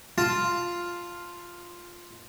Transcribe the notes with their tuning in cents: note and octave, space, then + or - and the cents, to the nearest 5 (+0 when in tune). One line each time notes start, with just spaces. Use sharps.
F4 +0 A5 +0